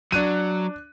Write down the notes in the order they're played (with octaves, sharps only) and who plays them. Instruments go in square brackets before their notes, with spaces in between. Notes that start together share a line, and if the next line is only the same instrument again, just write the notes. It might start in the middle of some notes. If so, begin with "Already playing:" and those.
[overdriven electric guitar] F#3 [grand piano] D4 F#6 D#7